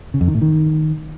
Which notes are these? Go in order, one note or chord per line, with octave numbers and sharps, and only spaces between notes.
C#3
F2
D#3
A2
D#3